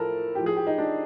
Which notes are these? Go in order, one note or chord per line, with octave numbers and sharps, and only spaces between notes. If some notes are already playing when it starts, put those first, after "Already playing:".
Already playing: A2 F3 A4 A#4
A2 F3 G4
G#4
G4
D#4
D4